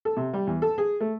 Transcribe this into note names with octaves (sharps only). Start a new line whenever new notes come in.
A4
C3
G3
E2
A4
G#4
A3